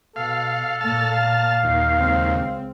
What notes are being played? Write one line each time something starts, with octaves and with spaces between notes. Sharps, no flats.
B2 A4 F5
A#2 A#3 A5 F6
F5
D#2
C#2 C4